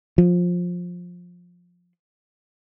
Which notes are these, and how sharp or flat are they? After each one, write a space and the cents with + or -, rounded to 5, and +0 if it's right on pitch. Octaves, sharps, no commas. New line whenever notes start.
F3 +15